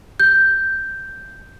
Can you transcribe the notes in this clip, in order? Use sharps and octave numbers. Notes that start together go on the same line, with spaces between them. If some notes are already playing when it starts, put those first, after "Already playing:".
G6